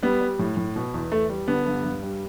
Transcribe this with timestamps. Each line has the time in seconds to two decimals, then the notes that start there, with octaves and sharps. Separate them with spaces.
0.02 G3 B3
0.21 G3
0.39 A2
0.57 A2
0.76 B2
0.94 E2
1.12 E2 A3
1.29 G3
1.48 D3 B3
1.66 G2
1.84 G2
2.03 G3